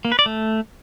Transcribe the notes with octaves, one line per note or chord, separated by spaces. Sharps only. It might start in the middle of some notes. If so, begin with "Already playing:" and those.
A#3
B4
D5
A3